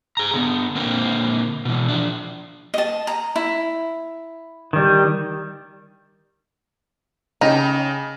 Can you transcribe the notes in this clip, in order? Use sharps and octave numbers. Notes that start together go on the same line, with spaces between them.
G#4 A#5
D3 B3
A#2 D3 A#3 C4
B2 E3
F3 D4
D#5 A5
A#5
E4
D#3 G3
C#3 D#4 G4